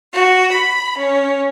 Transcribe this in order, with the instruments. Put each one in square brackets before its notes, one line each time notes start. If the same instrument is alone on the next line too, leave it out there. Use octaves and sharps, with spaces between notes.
[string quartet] F#4
B5
C#4